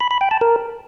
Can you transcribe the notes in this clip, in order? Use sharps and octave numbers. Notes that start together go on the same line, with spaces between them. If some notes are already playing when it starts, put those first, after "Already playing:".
B5
B5
G5
A5
A#4